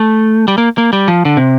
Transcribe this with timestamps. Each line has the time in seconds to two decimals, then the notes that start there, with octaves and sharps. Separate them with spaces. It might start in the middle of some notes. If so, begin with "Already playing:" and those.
Already playing: A3
0.48 G3
0.58 A#3
0.78 A#3
0.93 G3
1.08 F3
1.25 D3
1.37 C3